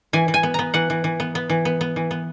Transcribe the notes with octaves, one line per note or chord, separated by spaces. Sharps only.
E3 G#5
E3
G#5
B3
B3 A#5
E3 F#5
E3
E3
B3
B3
E3
B3
B3
E3
B3